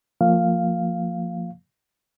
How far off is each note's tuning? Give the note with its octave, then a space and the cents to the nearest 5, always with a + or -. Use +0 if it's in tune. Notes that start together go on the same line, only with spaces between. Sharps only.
F3 +0 A#3 -30 F5 +0